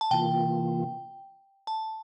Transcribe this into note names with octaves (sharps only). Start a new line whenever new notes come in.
A5
C3 E3 A#3 F4 G5
A5